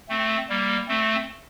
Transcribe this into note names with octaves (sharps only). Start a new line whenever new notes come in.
A3 C4
G3 A#3
A3 C4